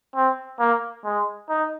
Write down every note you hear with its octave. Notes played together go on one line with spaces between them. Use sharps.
C4
A#3
G#3
D#4